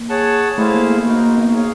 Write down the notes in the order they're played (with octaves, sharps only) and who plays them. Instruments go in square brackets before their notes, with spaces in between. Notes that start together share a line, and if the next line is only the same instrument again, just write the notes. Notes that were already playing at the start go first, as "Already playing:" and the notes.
Already playing: [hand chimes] A#3
[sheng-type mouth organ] G#4 C#5 F#5 A5
[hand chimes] A3 [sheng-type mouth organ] E4 G#4 C5 F5
[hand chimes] A#3
B3
[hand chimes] A#3 [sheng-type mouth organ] D#4 F#4 A#4
[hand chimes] A#3
B3
[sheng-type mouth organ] G#4 C#5 F5